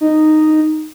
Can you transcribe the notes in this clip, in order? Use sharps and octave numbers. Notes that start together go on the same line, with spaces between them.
D#4